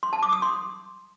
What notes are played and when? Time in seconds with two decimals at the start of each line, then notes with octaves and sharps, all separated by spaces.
0.03 C6
0.13 A5
0.23 D6
0.32 D#6
0.42 C6